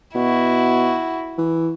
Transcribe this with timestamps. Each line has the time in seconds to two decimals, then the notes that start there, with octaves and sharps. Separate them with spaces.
0.15 B2 E4 F#4
1.38 E3